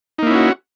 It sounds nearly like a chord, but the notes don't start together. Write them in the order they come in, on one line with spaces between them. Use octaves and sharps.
D#4 A#3 E4 C#4 F#4